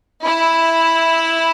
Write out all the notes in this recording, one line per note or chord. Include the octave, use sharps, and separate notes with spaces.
E4